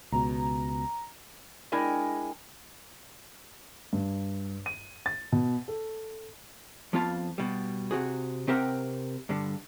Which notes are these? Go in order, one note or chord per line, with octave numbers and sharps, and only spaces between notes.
C#2 B2 A#5
G#3 D4 E4 A#4 G5 G#5
G2
D#7
A6
B2
A4
F2 F3 B3 F4 F5 A5
B2 G3
C3 F#4 G#4
C3 C4 G4 A#4 E5 F#5
G2 D3